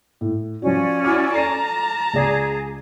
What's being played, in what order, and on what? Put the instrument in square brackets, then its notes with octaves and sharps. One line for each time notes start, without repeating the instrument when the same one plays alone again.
[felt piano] A2
[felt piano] F3 F#4 [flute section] C#4 D5
[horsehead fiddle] E4 F#4 [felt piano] D6 F6
[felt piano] A4 C7 D#7 [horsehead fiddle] A5 A#5
[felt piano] C#2 D5 [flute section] G#4